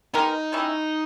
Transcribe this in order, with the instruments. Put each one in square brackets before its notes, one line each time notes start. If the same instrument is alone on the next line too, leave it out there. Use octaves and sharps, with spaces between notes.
[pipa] G#3 B3 G4 A#4 [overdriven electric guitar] D#4
[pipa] D#3 G3 C#4 E4